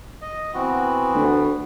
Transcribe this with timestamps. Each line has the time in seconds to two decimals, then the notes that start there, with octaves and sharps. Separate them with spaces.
0.22 D#5
0.54 E3 B3 C4 F#4
1.15 D2